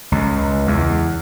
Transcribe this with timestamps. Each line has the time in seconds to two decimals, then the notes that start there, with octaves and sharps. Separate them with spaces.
0.12 C#2
0.67 E2